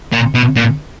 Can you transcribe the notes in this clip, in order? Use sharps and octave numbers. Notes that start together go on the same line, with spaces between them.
A#2
B2
A#2